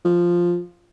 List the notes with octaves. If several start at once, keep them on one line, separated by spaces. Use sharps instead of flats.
F3